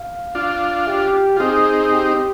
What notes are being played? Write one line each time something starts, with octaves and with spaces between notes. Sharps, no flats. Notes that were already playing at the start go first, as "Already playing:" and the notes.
Already playing: F5
D4 F4 F5
G4
F4
C4 D#4 G#4
G4